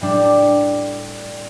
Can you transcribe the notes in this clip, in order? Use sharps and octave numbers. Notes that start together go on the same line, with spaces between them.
A2 G3 D4